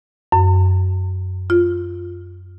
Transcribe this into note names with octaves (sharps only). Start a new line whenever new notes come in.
F#2
F4